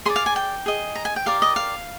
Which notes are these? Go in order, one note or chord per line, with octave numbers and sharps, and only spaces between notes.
G#4 D5 C6
F5
G#5
G5
G#4 D#5
A#5
G#5
G5
G4 A#4 D5 F5
D#5
F5